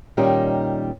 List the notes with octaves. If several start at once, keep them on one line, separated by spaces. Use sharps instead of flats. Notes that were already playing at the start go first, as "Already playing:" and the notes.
A#2 D#3 G3 C#4 D#4 G4